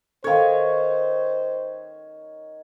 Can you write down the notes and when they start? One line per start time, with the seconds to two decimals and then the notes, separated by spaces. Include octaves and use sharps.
0.24 D#3 A4 C5 C#5 F5